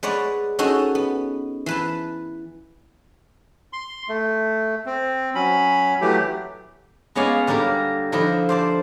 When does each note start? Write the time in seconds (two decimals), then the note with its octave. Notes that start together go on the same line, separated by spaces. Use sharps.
0.03 G#3 B4 C#5 D5 F#5
0.59 C#4 D#4 F#4 G#4 A4
0.95 B3
1.66 E3 B4 A5
3.73 C6
4.09 A3
4.86 C4
5.35 F#3 C#4 B5
6.01 E3 F#3 A3 G4
7.15 G#3 B3 C#4 D5 F5 G#5
7.47 D3 G3 A#3 A#4 D5
8.12 D3 F3 E4 D#5
8.49 C5 D5 A5